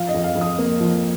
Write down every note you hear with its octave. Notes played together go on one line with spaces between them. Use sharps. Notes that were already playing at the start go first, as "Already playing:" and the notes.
Already playing: F3 F5
D#5
F2
F5
F2
D#6
A#3
F3